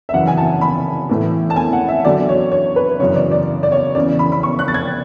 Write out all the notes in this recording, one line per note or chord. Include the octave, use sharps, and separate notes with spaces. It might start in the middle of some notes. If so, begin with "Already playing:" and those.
E5
F#2 C#3 E3 F#5
G#5
A5
B5
A2 E3
A5
G#5
F#5
E5
E2 D3 F#3 D5
C#5
C#5
B4
F#2 C#3 E3 C#5
D5
D5
D5
C#5
E2 C#3 E3 D5
B5
B5
C#6
F#6
A6
G#6